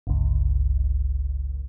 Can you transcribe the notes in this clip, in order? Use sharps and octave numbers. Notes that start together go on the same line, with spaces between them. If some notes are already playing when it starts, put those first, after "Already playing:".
G1 C#2